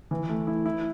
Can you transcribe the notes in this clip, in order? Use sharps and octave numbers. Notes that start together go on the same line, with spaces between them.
E3
A3
E4
E4